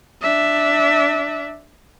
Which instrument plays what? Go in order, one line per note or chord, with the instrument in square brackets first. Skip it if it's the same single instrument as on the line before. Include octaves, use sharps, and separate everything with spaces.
[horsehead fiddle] D4 E5